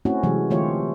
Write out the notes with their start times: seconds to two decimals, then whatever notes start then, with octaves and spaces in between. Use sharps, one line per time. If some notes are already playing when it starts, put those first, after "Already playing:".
0.05 A3 C4 C#4 E4 F#4
0.23 C3 E3 F#3 G#3
0.50 D3 E3 A3 F4 G4 C#5